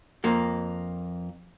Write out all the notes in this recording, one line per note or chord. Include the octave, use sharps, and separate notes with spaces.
F2 A#3